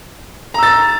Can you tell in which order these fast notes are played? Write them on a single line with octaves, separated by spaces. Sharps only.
A#5 E6 A6